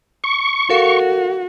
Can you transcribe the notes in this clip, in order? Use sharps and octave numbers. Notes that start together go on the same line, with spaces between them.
C#6
F#4 A4 A#4 F5